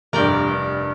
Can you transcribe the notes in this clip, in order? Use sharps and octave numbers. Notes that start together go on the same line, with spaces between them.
F1 G2 A#4 D5 G5